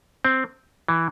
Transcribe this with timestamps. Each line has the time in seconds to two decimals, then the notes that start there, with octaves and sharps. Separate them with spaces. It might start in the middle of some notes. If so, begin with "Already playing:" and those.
0.25 C4
0.88 E3